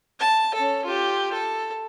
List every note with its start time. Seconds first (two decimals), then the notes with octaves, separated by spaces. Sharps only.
0.20 A5
0.54 C#4 A4
0.85 F4 G4
1.33 A4